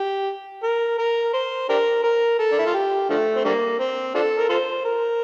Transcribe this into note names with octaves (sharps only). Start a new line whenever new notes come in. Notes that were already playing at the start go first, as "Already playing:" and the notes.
Already playing: G4
A#4
A#4
C5
D4 G4 A#4
A#4
A4
D4
E4
F4
G4
D3 F3 A3
C4
D3 G3 A#3
C4
D4 F4 A4
A#4
F4 A4 C5
A#4